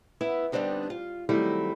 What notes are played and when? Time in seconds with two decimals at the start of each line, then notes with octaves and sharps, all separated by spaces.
0.21 B3 E4 B4
0.52 D3 G3 B3 C4 D4 D#4
0.90 F4
1.29 D#3 F#3 G3 A3 C4 E4